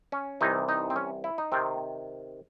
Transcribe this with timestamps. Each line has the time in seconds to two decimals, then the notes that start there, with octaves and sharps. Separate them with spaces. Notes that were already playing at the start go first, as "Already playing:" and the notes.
0.12 C#4
0.41 C2 C3 E3 D#4
0.69 D#4
0.90 C4
0.96 C#4
1.24 E4
1.38 D#4
1.52 C3 D#3 C4